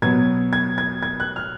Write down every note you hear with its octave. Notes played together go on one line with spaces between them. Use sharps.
B2 F#3 B3 G#6
G#6
G#6
G#6
F#6
F6